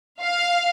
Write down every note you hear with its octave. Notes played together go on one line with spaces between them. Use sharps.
F5